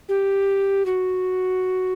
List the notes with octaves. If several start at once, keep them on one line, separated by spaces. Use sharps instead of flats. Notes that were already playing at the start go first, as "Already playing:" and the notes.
G4
F#4